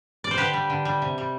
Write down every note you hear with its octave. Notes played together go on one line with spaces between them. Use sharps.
D5
C5
D3 G4 B4
G3
D3
G3
C3
G3